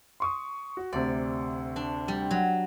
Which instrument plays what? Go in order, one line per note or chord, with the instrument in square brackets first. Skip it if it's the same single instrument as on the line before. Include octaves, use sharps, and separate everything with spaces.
[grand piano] C6 C#6 D#6
F#4
[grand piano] D2 C3 [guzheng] D5
[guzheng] D4
G3
F#3